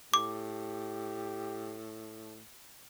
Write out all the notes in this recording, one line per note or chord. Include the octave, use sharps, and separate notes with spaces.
A2 G4 D6